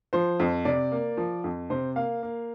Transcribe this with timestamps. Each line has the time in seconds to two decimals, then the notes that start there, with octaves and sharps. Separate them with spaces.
0.13 F3 C5
0.40 F2
0.65 C3 D5
0.92 A#3
1.17 F3
1.44 F2
1.70 C3 C5
1.96 A#3 F5
2.23 A#3